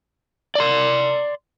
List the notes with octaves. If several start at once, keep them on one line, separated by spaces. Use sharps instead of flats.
D5 C6